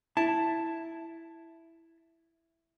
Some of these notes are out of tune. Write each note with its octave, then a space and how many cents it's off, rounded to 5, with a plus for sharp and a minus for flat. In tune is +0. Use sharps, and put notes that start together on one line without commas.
E4 +0 A5 +0